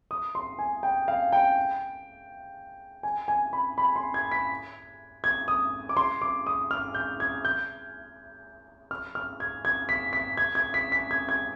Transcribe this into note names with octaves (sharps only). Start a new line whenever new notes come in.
D#6
C6
G#5
G5
F5
G5
G#5
G#5
B5
B5
C6
G#6
B6
G#6
D#6
D6
C6
D6
D#6
F6
G6
G#6
G6
F6
F6
G#6
G#6
B6
B6
G#6
G#6
B6
B6
G#6
G#6